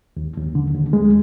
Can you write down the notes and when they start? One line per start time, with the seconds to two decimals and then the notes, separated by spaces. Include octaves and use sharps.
0.17 D#2
0.37 D#2
0.55 D3
0.74 D#2
0.93 G#3